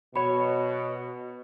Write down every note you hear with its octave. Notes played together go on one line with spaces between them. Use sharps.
B2 F#4 C#5 B5